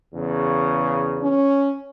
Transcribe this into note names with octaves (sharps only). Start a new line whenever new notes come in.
E2 C#3
C#4